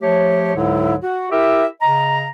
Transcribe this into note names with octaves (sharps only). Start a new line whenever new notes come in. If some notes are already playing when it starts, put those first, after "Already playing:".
F3 A3 G4 C#5
C#2 G#2 D3 F#3 E4
F#4
E4 G4 A#4 E5
C#3 D#5 A#5